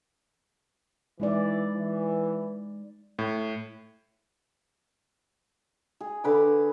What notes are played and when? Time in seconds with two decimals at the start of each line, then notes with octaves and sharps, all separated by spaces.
1.20 E3 G#3 D#4 D5
1.75 E3
3.19 A2
6.00 G#4
6.24 D3 B4 D6